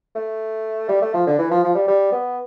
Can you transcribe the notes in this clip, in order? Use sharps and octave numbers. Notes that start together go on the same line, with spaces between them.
A3
G3
A3
F3
D3
E3
F3
F3
G3
G3
B3